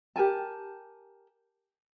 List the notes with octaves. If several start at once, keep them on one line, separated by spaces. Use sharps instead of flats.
G4 A#4 G#5 A5